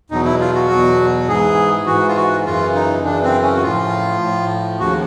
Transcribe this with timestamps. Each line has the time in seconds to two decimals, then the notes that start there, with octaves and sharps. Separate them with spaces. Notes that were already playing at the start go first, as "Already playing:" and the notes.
0.10 E2 B2 F#3 D#4
0.25 E4
0.41 F4
0.55 F#4
0.70 E2 B2 F#3
1.28 G#2 E3 G#4
1.86 G#2 E3 F#4
2.08 F4
2.16 F#4
2.46 F#2 C#3 E3 F4
2.75 D#4
3.04 F#2 C#3 E3 D4
3.23 C4
3.43 C#4
3.56 F#4
3.63 A2 F3 F4
4.21 A2 F3
4.79 D#2 C#3 F3 F#4